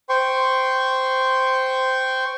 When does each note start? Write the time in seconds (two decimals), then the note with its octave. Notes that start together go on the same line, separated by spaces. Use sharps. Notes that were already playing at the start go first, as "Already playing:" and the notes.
0.09 C5 G5 C6 C#6